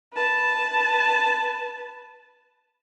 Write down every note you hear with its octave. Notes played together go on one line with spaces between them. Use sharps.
B4 A5